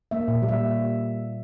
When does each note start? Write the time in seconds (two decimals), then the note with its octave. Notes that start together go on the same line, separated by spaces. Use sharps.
0.11 A#3 E5
0.28 A#2
0.43 G3
0.48 E5